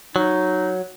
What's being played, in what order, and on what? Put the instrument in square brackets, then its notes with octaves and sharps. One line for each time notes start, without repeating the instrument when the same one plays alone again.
[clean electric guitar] F#3 [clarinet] D#4